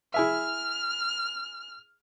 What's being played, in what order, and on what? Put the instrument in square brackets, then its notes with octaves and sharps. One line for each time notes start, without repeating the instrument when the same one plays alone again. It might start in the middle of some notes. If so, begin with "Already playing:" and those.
[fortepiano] E4 G#4 E5 [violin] F6